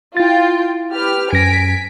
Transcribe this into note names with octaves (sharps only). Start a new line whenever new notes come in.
E4 F4 G5 A6
G4 B4 F6
F#2 G#5 A#6 B6 D7